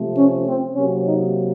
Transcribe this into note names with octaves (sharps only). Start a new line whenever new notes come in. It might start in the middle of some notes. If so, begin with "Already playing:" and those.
Already playing: C3 F3 A3
C#4
C4
C3 F#3 A#3 C#4
D#4